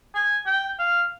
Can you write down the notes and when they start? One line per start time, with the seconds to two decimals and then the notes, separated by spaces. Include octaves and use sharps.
0.15 G#5
0.46 G5
0.79 F5